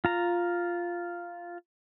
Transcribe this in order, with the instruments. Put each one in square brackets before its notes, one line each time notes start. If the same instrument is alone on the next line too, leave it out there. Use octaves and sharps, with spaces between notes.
[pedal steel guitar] F4 A#5